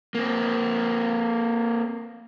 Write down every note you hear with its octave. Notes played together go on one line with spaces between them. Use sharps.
A#3 C4